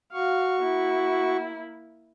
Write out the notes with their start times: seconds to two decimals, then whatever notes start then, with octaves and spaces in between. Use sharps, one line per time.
0.13 F#4 F5 C#6
0.62 A#3 E4